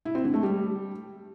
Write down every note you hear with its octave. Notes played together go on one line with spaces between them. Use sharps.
E4
C4
D3
A3
G3